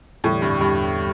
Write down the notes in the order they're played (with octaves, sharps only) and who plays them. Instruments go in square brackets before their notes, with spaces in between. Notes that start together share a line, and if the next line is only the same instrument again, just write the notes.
[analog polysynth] E2 D3 G3 [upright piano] A2
[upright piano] G2
G2